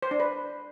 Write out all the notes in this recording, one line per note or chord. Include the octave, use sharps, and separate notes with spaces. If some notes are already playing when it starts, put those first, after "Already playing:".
C5
D4
B4